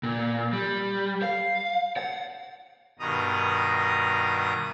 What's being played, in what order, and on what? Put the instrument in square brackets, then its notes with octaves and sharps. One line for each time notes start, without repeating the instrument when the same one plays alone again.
[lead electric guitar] A#2
G3
F5
F#5
[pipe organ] G2 B2 D#3 A#5 D#6